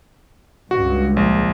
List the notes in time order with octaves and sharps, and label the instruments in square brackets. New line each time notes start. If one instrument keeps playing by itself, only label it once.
[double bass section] C#2 G2 [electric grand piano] F#4
[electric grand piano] A#1